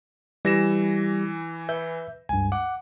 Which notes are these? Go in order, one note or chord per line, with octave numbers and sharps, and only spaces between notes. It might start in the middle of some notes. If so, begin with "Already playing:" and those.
E3 G3 A#6 E7
B4 E5 G6
C#2 G2 G#5
F#5 D6